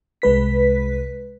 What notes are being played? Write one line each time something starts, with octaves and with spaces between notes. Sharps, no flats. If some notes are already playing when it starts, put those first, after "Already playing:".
C2 G#3 B4 B6